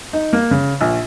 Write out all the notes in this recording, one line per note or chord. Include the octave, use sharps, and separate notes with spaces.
D#4
A#3
C#3
A#1